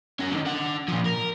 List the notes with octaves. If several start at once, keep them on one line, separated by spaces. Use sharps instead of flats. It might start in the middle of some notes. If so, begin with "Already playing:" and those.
C#4 F#4
D3 D#3
D4 F#5
A#2 F3
A#4